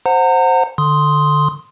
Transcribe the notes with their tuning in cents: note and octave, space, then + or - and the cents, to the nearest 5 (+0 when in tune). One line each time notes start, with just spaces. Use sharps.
C5 +0 F#5 -10 A#5 -35
D3 +5 C6 +0 D#6 +10